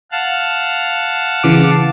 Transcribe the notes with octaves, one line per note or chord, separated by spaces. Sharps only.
F5 F#5 A5
C#3 E3 D6